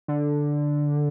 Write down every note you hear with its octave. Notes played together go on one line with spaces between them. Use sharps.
D3